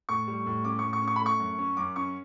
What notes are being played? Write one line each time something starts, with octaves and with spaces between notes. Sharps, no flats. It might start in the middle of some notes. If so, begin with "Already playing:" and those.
A2 C#6
G3
A2
C#4 D6
A2 C#6
C#6
C#4
C#6
B5
A3 C#6
F#2
C#4
F#2 D6
C#4 C#6